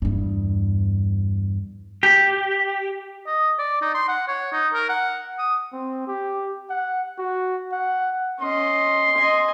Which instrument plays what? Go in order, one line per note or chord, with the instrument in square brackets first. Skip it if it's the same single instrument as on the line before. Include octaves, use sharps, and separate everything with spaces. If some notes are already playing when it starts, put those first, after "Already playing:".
[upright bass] E2 G2
[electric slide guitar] G4
[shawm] D#5
D5
D#4
C6
F#5
C#5
D#4
A#4
F#5
D#6
[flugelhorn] C4
G4
F#5
F#4
F#5
[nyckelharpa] C#4 D#5 [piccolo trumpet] C6
[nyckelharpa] D#5 G#5